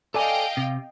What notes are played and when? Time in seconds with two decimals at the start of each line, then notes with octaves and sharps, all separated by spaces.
0.14 A4 D5 D#5 F5 G5 G#5
0.57 C3